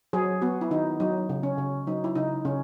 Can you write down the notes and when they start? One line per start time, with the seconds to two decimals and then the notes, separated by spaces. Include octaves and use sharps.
0.13 F#3 G#4
0.42 B3 F#4
0.61 E4
0.71 D#3 D#4
1.00 F#3 D#4
1.29 C#3
1.43 C#4
1.58 C#3
1.87 F#3 D#4
2.04 E4
2.15 C#3 D#4
2.45 C#3 C#4